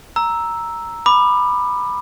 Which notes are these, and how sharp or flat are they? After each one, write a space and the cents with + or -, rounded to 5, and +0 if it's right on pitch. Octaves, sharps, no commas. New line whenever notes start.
A#5 +0 E6 +0
B5 +0 D6 +25